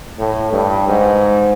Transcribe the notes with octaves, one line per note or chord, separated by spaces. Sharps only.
A2
G2
G#2